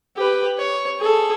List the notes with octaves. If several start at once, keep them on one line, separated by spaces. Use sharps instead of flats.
G4 B4
C#5
G#4 A4